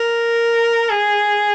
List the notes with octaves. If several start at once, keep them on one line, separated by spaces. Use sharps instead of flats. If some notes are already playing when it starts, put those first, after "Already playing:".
Already playing: A#4
G#4